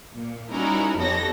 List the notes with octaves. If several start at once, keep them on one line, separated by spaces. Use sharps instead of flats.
A#2
G3 C#4 D#4 E4 F#4 A#4
F2 B3 G4 A4 C#5 A#6